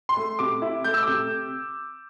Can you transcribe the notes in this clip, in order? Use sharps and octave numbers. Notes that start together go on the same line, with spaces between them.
C6
A3
C3 D6
E4
A3 G6
E6
D6
C3